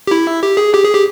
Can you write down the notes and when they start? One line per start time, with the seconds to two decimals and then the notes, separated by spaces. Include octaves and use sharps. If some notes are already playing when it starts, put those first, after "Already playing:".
0.07 G4
0.11 E4
0.43 G4
0.57 G#4
0.74 G4
0.84 G#4
0.94 G4